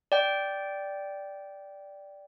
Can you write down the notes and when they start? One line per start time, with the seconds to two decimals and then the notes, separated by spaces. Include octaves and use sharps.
0.12 D5 G5